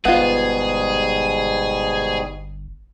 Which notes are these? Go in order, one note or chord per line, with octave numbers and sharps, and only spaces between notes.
G1 G#2 B2 G3 B3 F4 G#4